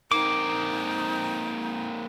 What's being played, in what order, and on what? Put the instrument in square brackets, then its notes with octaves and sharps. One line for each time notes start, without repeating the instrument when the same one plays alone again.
[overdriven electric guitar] A#3 C4 [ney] D#4 [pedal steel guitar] D6